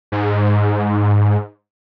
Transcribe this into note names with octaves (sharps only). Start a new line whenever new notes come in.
G#2